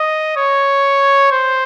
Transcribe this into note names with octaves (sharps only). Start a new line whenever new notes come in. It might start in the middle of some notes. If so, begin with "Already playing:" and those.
Already playing: D#5
C#5
C5